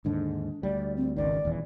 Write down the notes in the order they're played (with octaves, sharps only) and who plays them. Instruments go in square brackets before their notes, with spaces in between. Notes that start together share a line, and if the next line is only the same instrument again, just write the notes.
[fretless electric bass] D#2 G#2 D3 [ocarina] D4
[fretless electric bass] D2 G3 [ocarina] D5
[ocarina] C4
[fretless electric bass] G#1 C#2 D#3 [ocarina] D5
[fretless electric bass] D#1 E2 E3